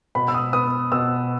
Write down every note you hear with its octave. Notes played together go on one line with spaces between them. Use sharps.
B2 B5
E6
D#6
B3 D#6
B2 E6